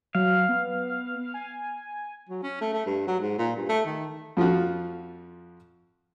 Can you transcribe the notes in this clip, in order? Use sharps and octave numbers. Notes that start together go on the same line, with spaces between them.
F#3 F5
B3
G#5
F#3
C#4
A3
A3
G2
F#3
G#2
A#2
G2
A3
D#3
F2 F3 F4 F#4